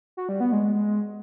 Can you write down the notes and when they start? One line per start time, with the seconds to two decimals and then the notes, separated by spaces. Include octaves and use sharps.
0.17 F#4
0.29 G3
0.40 B3
0.52 G#3